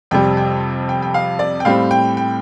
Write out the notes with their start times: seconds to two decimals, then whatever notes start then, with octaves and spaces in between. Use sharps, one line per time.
0.11 F2 C3 G3 G5
0.37 G5
0.89 G5
1.02 G5
1.14 F5
1.39 D5
1.60 G5
1.65 A2 G3 C4 F5
1.91 G5
2.17 G5